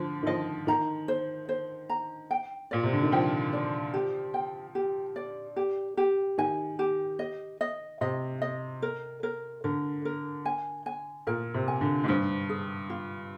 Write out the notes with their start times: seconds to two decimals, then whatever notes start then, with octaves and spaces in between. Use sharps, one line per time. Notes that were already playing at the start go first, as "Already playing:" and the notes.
Already playing: D3 F3
0.23 D#3
0.26 F3 D#5
0.67 D#3 A#5
1.08 C5
1.49 C5
1.89 A#5
2.31 G5
2.71 A#2 D5
2.83 C3
2.93 D3
3.03 D#3
3.12 F3 G5
3.53 D5
3.94 G4
4.34 G5
4.75 G4
5.16 D5
5.56 G4
5.97 G4
6.38 D#3 G#5
6.79 G4
7.19 D#5
7.61 D#5
8.01 C3 D#5
8.42 D#5
8.82 A#4
9.23 A#4
9.64 D3 A#4
10.05 A#4
10.45 G#5
10.86 G#5
11.27 A#2 A#4
11.54 C3
11.68 G#5
11.81 D3
12.04 G#2
12.08 G2 C5
12.49 G#4
12.90 F4